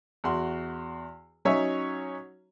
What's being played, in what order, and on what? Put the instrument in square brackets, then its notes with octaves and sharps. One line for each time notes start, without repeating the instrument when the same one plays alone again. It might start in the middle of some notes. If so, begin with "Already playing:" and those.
[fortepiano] E2 F#4 C6
F#3 C#4 D#4 C#5 E5